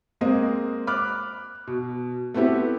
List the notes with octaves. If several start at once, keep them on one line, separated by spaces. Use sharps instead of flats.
G#3 A#3 C4 D#5
B5 D6 F6 F#6
B2
A3 B3 C4 E4 G4